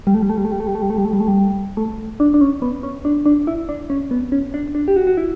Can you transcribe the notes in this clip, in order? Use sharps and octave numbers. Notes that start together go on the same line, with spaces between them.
G3
A3
G3
A3
G3
A3
G3
A3
G3
A3
G3
A3
G3
A3
G3
A3
G3
A3
D4
D4
C#4
B3
C#4
D4
D4
E4
D4
C#4
B3
C#4
D4
D4
G4
F#4
F#4
E4